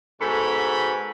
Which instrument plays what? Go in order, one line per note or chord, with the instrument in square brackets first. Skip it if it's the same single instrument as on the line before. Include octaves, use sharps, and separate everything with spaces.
[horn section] G#2 B2 A4 C#5 B5